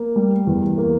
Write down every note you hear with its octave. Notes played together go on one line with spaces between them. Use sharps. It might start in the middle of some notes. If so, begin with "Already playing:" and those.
Already playing: A#3
G3
E2
A#3